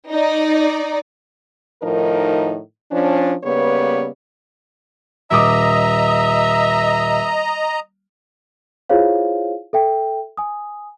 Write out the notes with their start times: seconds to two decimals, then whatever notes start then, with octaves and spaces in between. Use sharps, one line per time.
0.11 D#4 D5
1.83 A2 D#3 F3 D#4 A#4
2.92 F3 C#4 D4
3.44 C#3 G3 A#3 B3 B4 C#5
5.31 D#1 D#5 E5 A#5 D6 D#6
8.89 E4 F4 G#4 C5 C#5 F5
9.73 A4 E5 G5
10.37 G#5 D#6